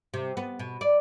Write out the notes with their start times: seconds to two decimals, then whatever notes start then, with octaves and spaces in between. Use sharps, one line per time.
0.14 C3
0.37 B3
0.59 B2
0.81 D5